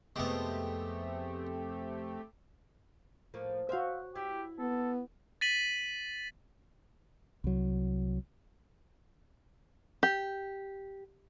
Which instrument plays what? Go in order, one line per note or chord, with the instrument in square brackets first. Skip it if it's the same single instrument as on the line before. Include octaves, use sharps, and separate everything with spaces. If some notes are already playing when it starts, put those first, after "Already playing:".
[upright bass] F2 C3 [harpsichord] G#3 B3 [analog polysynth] A3 C4 G4
[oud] A2 F3 A#3
[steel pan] F#4 C5 [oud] E5 F5
[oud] E4 [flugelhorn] G4
[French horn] B3 [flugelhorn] A4
[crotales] A6 B6 D#7 F#7
[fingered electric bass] C2 F#3
[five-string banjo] G4